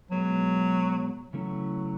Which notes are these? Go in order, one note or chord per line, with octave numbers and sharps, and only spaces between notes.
B2 F#3 G#3 B3
C#3 E3 F#3 A3 C#4 E4